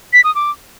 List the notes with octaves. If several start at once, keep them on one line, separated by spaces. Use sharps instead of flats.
B6
D#6
D6